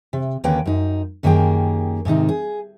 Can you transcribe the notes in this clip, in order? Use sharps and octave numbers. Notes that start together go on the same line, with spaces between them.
C3
D#2 D3 A#3 C#4 B4 G5
F#2 D#4
F#2 D#3 A#3 G4 G#4 G5
G#2 C3 D#3 D#4
G#4